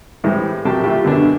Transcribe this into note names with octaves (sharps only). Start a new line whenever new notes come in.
A2 E3 G3 G#3 C4
A#1 C3 F#3 G4 G5 A5
A3 E4 F4 G4
F#2 B2 D3 B3 D4